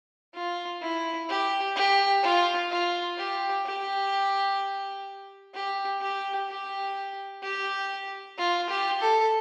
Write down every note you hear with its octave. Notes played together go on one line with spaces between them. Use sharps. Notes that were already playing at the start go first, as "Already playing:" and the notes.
F4
E4
G4
G4
F4
F4
G4
G4
G4
G4
G4
G4
F4
G4
A4